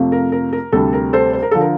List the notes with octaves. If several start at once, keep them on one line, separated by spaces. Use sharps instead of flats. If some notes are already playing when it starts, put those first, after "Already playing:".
Already playing: F2 C3 F3 A3
A#4
A#4
A#4
D2 C3 G3 A4
A#4
A4 C5
C5
A#4
D3 F3 A4
A#4